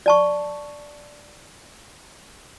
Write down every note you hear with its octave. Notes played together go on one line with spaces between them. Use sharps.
D5 A5 C#6